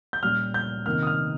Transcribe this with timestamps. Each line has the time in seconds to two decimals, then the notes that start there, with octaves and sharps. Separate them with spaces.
0.13 G6
0.22 A#2 G3 C#4 F6
0.54 G6
0.86 C3 D#3 A#3 C#4 F6
1.03 D#6
1.07 F6